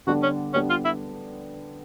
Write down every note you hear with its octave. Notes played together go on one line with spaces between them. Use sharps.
D3 G3 B3 D4 F#4
C#4
D3 G3 B3 C#4 D4
F4
E4